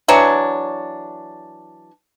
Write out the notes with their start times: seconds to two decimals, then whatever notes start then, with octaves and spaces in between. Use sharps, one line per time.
0.08 E3 F#3 D4 C#5